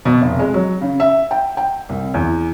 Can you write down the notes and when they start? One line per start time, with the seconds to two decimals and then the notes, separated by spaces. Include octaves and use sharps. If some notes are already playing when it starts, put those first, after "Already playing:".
0.05 B2
0.22 F1
0.39 G#3
0.54 F#3
0.81 C#3
1.00 E5
1.31 G5
1.57 G5
1.89 C2
2.14 E2